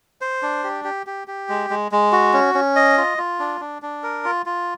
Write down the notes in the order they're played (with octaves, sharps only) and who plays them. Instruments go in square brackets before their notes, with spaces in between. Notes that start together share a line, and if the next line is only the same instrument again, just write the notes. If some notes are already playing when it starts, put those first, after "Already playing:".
[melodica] C5
D4
G4
G4
G4
G4
G#3
G#3
G#3
F#4
C#4
C#4
D#5
F4
F4
D4
D4
D4
A#4
F4
F4